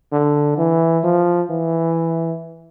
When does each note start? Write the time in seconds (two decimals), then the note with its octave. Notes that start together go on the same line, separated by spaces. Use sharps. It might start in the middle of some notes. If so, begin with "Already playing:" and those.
0.12 D3
0.57 E3
1.04 F3
1.50 E3